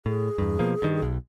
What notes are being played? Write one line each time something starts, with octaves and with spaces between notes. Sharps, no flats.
A2 G#4
E2 G2
B2 F3 A#3
G2 D#3
B1